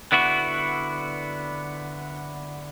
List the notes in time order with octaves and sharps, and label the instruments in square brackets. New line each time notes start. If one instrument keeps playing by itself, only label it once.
[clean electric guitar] D3 B3 E4 F#4